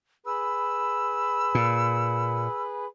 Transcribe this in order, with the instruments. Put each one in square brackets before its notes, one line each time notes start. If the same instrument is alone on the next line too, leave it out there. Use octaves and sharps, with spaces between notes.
[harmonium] G#4 B4 [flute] B5 [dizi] E6
[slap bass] A#2